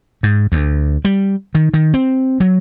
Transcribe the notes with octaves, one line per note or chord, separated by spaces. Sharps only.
G#2
D2
G3
D#3
D#3
C4
F#3